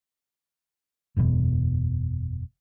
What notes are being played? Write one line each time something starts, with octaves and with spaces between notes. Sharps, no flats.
F#1 E2 G2 B2